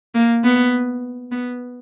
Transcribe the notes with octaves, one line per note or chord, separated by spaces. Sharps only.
A#3
B3
B3